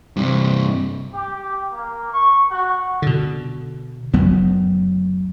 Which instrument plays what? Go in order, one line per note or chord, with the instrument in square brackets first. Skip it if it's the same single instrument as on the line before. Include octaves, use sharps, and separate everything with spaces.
[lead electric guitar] G2 C3
[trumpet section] G4
A#3
C#6
F#4
[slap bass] B2 D3
F#1 D2 F#3 B3